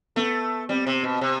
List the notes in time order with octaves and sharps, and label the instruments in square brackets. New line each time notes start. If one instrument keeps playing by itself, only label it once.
[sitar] A3 [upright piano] B3
[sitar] G3 [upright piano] C4
[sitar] C3
B2
C3